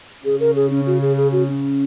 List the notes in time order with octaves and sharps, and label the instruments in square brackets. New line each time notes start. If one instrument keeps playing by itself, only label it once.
[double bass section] C#3 [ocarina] G#4
[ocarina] A#4
G#4
C#4
F#4
G#4
G#4
F#4
C#4